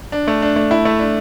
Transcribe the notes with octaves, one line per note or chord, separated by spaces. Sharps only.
D4
A3
D4
A3
E4
A3
D4